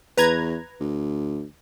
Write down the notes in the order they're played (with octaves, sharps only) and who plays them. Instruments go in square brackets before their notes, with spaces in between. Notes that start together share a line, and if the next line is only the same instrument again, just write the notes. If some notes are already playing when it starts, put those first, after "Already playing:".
[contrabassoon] E2 [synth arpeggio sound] B4 A#5 G#6
[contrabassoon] D2